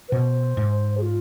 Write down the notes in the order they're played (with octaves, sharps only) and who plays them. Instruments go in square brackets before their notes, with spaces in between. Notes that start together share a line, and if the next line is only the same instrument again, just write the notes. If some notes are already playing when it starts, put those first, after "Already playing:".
[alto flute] B4
[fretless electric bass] B2 [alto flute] C5
[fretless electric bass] G#2
[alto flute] G#4
F4